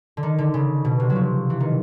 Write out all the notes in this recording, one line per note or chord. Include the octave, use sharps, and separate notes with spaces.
D3
D#3
D3
C#3
B2
C3
F#3
F3
E3
D#3